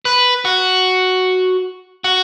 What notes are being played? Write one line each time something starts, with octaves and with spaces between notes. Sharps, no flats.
B4
F#4
F#4